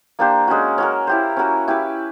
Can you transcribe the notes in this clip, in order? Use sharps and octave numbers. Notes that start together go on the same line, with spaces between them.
A#3 D4 G4 C5
G#3 C#4 F#4
C#4 F#4 A#4
E4 G4 C5
C#4 F#4 A#4
E4 G4 B4